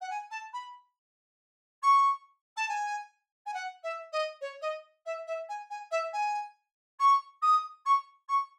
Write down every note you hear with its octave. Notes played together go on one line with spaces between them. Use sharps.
F#5
G#5
A5
B5
C#6
A5
G#5
G#5
F#5
E5
D#5
C#5
D#5
E5
E5
G#5
G#5
E5
G#5
C#6
D#6
C#6
C#6